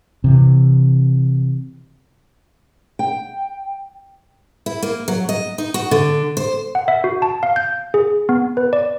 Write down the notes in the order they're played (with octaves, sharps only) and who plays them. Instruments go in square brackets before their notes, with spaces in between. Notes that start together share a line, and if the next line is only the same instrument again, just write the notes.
[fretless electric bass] C3 E3
[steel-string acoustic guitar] G5
E4
A#3
F#3
D#5
D#4
F#4
D3
C5
[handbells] F#5
E5
F#4
A5
F5
G6
G#4
B3
B4
D5